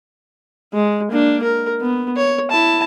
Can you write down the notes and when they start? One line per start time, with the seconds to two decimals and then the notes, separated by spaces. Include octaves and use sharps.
0.73 G#3
1.11 A#3 D4
1.43 A#4
1.81 B3
2.17 C#5
2.51 E4 A5